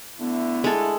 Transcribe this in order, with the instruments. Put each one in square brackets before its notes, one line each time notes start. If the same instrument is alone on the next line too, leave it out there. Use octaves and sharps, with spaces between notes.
[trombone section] D3 A3 E4 [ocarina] B3
[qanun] G#3 A4